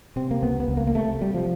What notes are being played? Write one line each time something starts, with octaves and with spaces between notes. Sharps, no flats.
C3 C4
A#3
C#2 B3
B3
C#2
A#3
A#3
C3 A3
C3 G3
F3